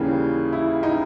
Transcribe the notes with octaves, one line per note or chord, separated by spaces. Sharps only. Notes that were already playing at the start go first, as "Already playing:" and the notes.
Already playing: D#2 C#3 E3 G3 A#3 G#4
E4
D#4